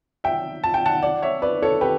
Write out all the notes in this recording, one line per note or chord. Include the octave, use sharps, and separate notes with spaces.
E5 G5
A5
G5
F#5 A5
D5 F#5
C#5 E5
B4 D5
A4 C#5
G4 B4